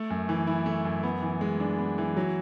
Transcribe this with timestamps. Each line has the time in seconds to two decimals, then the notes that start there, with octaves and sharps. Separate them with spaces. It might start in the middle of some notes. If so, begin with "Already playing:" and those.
Already playing: A3
0.10 F#2
0.29 E3
0.47 E4
0.66 A3
0.85 F#2
1.03 B3
1.22 E3
1.41 G#3
1.60 D4
1.78 B3
1.98 E3
2.17 F#3